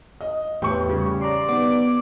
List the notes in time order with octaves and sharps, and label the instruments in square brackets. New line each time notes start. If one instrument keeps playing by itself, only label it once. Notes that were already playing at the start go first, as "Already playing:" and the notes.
[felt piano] D#5
[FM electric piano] E2 G4 B4 [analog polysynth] A2 [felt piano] G5 C#6
[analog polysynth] C#3 [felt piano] G3
[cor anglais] D5 [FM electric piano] A#5 C6
[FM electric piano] D#3 B3 [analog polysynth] D6